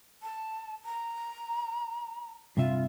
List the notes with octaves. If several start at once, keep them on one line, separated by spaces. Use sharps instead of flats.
A5
A#5
G2 C3 F4 E5